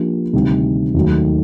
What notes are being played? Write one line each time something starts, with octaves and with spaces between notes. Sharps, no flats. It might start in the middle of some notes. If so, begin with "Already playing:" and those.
Already playing: F3 A#3 D4 G4
D2 C3 D#3 G3
D#2 D#3 F#3 A3